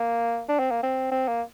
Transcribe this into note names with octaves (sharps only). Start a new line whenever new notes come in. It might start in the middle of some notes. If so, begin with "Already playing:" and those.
Already playing: A#3
D4
C4
A#3
C4
C4
A#3